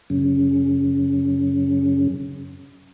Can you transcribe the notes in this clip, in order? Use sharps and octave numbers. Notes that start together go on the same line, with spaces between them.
F#2 C#3